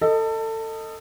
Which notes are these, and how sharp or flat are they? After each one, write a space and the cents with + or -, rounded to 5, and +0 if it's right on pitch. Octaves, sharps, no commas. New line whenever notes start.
A4 +25 D#5 +0